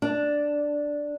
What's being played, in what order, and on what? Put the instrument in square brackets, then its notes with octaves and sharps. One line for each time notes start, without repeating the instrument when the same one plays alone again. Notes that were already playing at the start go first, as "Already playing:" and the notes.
[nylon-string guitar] D4